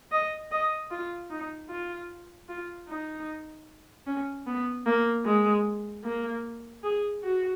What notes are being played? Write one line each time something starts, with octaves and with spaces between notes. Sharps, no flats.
D#5
D#5
F4
D#4
F4
F4
D#4
C#4
B3
A#3
G#3
A#3
G#4
F#4